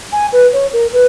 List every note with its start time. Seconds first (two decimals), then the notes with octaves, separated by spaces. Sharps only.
0.12 G#5
0.32 B4
0.53 C#5
0.73 A#4
0.93 B4